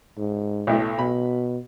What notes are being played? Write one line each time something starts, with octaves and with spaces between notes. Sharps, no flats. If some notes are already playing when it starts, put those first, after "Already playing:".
G#2
B1 A2 A3
B2 B5